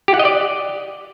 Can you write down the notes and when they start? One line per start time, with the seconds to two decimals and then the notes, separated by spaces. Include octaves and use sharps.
0.08 G4
0.14 F#5
0.19 D#5
0.25 D5